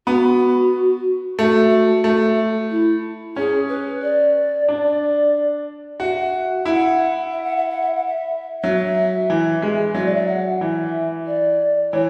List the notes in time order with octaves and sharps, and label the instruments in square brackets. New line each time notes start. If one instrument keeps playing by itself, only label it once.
[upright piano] B3 [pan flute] F#4
[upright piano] A3 [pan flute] F#4
[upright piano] A3
[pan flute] E4
[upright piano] C#4 [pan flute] G#4
[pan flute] B4
D5
[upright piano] D4
[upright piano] F#4 [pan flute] E5
[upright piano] E4 [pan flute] F#5
[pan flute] E5
F#5
E5
F#5
E5
F#5
E5
[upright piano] F#3 [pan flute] E5
[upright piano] E3
G#3
[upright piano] F#3 [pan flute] E5
[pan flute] D5
E5
F#5
[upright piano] E3 [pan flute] E5
[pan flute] D5
[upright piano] E3 [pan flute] C#5